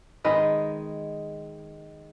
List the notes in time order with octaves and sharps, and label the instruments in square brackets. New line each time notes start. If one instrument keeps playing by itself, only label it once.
[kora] D#3 G#3 B4 D#5